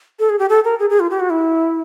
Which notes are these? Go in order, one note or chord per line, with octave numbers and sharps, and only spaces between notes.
A4
G#4
G4
A4
A#4
G#4
G#4
F4
G4
F#4
E4